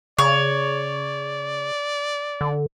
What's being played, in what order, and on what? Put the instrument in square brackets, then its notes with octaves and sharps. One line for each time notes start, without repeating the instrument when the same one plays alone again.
[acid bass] C#3 [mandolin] C#5 [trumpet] D5
[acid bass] D3